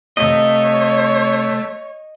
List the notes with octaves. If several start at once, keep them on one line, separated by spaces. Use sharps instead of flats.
C3 A3 C#5 D#5 F5